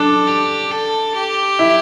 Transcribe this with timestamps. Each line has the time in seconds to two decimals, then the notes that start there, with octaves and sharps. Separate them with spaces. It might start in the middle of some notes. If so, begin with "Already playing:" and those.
Already playing: D4 A4
0.27 G4
0.71 A4
1.15 G4
1.59 E4